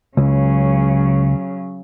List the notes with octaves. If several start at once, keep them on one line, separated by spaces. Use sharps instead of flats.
C#2 C#3 F#3